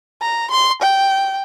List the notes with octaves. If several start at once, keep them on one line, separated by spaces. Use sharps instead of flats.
A#5
C6
G5